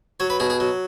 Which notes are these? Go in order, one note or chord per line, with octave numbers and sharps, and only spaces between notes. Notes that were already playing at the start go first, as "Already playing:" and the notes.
F#3 C#5
B4
B2 G#4
G#4
F#3